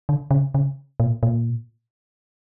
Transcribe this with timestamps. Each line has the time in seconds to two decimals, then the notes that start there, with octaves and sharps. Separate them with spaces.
0.09 D3
0.31 C#3
0.55 C#3
1.00 A#2
1.23 A#2